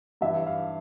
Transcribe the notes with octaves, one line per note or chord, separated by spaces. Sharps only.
G2 E3 E5
F5